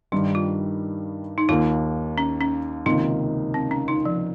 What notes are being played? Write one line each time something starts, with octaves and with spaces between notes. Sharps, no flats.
G2 D#3 G3 D#4
F4
D#4
D#2 D#3 A#3 F4
C#4
C#4
C#2 C3 D#3 A#3 D#4
C4
C#4
D#4
F3